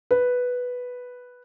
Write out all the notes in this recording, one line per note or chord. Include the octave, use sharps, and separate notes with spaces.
B4